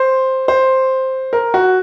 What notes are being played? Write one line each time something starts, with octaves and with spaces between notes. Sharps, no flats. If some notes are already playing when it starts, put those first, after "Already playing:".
Already playing: C5
C5
A#4
F#4